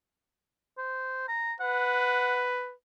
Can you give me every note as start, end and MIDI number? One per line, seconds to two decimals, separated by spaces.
0.78 1.27 72
1.28 1.53 82
1.60 2.75 71
1.60 2.47 78